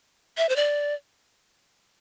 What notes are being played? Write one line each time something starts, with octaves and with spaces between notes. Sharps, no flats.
E5
C5
D5